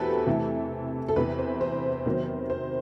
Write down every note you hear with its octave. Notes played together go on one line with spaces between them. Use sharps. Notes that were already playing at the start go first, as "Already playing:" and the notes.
Already playing: E2 B2 C4 E4 F#4 G4 A4 B4
C3 E3 A3 E4
A4
E2 C3 E3 B4
C5
C5
C3 D#3 F#3 B3
C5